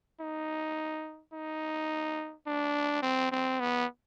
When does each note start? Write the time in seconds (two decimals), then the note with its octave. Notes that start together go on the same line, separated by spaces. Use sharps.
0.20 D#4
1.33 D#4
2.47 D4
3.03 C4
3.31 C4
3.60 B3